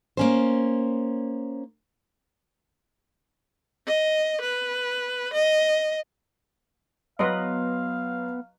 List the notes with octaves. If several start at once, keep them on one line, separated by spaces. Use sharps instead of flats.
A#3 C#4 C5
D#5
B4
D#5
F#3 B3 B4 D#5 F5 C6